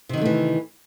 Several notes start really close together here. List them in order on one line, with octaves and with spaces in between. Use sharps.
C3 D#3 F#3 A3 E3